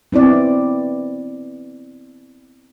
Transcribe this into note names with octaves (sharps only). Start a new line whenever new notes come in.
B3 C4 E4 D5